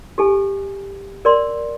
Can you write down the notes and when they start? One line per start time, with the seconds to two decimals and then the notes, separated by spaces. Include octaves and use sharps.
0.18 G4 A4 G#5
1.25 A#4 D5 C6